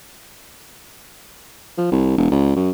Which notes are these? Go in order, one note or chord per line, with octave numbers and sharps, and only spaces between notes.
F3
C2
E1
C#2
F#2